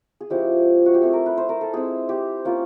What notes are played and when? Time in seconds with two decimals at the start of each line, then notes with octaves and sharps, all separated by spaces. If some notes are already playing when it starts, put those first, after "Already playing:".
0.20 G#4
0.30 F3 G#3 C#4 E4 G4
0.86 F#4
0.94 G4
1.02 A3 C4 E4 G#4
1.13 A#4
1.26 B4
1.38 C5
1.49 A#4
1.61 A4
1.73 G#3 C4 E4 G#4
2.09 G4
2.45 A#3 C#4 F4